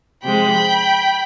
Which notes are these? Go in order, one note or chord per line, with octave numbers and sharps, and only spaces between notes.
C3 F3 G#3 G5 B5